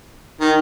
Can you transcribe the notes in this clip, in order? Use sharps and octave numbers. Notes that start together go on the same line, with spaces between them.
D#3